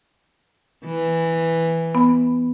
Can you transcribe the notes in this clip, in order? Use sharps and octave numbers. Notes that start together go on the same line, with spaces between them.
E3
B3 B5